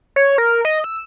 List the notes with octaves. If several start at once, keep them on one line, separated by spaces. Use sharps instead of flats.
C#5
A#4
D#5
E6